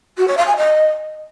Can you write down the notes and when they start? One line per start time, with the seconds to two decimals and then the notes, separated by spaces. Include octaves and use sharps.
0.17 F#4
0.27 C#5
0.37 F5
0.47 G#5
0.57 D#5